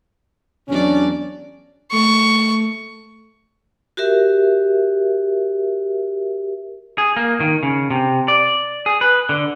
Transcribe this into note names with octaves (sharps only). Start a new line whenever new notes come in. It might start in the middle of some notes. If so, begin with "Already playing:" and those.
E2 F#3 C#4 D4 D5
A3 C#6
F#4 G4 A#4 E5
G#4
A#3
D#3
C#3
C3
D5
G#4
B4
D3